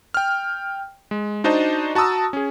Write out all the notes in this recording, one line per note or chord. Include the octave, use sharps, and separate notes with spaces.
G5 F6
G#3
D4 D#4 F#4 C5 D#5 A5
F#4 A5 A#5 D#6 E6
C#4 G#4